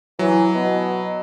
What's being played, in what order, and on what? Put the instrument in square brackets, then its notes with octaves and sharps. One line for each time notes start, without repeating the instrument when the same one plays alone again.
[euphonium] E3 [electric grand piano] F#3
[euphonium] B2